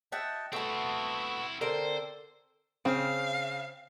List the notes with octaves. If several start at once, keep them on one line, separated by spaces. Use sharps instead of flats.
F#4 D#5 E5 G5 A5
A3 B3 C4 E4 F#4 A5
D3 C4 A4 A#4 C5
C#3 C4 F5